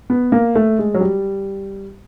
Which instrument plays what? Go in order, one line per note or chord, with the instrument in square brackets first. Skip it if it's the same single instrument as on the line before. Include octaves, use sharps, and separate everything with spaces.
[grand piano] B3
A#3
A3
G#3
F#3
G3